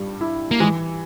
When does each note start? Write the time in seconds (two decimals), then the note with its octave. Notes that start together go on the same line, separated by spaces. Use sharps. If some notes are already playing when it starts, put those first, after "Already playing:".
Already playing: G2 G3
0.21 E4
0.51 A#3
0.60 E3 G#3